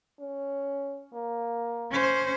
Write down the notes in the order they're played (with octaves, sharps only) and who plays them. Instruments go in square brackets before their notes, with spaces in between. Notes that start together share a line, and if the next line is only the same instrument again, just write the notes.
[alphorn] C#4
A#3
[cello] C#4 C5